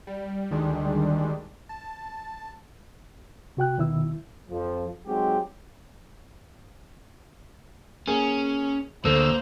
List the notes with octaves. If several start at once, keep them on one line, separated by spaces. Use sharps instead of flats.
G3
D2 D#3 G3 G#3 D4
A5
C3 F#4 G5 F#6
D#2 B2 D#3 E4 E5 E6
F2 F3
F#3 G#3 C4 D#4 F#4 G4
A#3 C#4 G#4
D2 A#3 A4 C5 E6